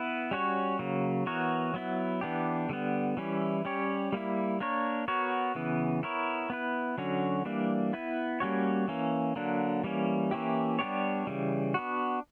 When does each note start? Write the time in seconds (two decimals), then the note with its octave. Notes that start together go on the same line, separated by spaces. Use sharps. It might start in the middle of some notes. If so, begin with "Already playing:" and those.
Already playing: B3 E4 B4
0.31 G3 C#4 F#4 C#5
0.79 C#3 F#3 A#3
1.26 E3 B3 F#4 A#4 C#5
1.74 F#3 B3 E4
2.21 E3 B3 D4 G4
2.69 D3 G3 B3
3.17 E3 G3 C#4 E4
3.65 G3 C#4 G4 C#5
4.12 G3 A#3 E4
4.60 A#3 D4 A#4 C#5
5.08 B3 F#4 A#4 C#5
5.55 C#3 E3 B3
6.03 B3 E4 A#4 C#5
6.50 B3 E4 B4
6.98 D3 F#3 C#4 F#4
7.45 E3 G3 A#3 D4
7.93 B3 E4 B4
8.40 G3 A#3 C#4 F#4 C#5
8.88 E3 A#3 C#4
9.36 D3 F#3 A#3 D4
9.84 E3 G3 A#3 C#4
10.31 E3 A#3 C#4 E4 G4
10.79 G3 B3 D4 G4 C#5
11.27 C#3 E3 G3
11.74 B3 D4 F#4